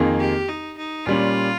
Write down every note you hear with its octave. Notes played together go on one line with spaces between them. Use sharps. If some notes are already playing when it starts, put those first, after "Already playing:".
Already playing: F2 D#3 A#3 F4 G#4
G4
D#4
D#4
A#2 G3 C#4 F4